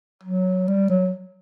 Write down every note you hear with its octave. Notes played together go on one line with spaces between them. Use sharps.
F#3
G3
F#3